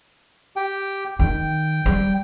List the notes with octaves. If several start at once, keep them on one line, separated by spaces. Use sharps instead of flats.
G4 G5
D#3 G5
G3